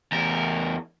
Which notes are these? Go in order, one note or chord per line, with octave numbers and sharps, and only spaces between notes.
E2 A#4